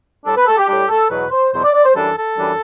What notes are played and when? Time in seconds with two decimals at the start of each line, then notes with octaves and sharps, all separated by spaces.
0.25 A2 G3 D4 A4
0.36 B4
0.47 A4
0.57 G4
0.68 A2 G3 D4 G4
0.89 A4
1.10 E2 B2 F#3 B4
1.31 C5
1.52 E2 B2 F#3 C5
1.63 D5
1.73 D5
1.85 C5
1.95 F#2 E3 G3 D4 A4
2.16 A4
2.37 F#2 E3 G3 D4